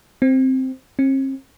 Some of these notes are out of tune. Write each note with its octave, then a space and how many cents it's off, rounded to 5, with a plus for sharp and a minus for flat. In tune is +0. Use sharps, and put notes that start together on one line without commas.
C4 +0
C4 +45